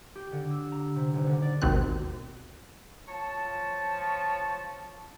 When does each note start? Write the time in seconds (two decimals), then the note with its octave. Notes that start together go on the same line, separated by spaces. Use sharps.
0.15 G4
0.32 D3
0.51 E6
0.72 A#5
0.96 C3
1.14 D#1
1.27 D3
1.42 D5
1.62 G#1 D#2 B2 D#3 C4 F#6
3.09 F3 C#5 A5